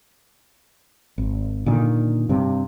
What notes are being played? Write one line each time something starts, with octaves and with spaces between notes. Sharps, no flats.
G#1
A#2 D3 D#3
G2 C3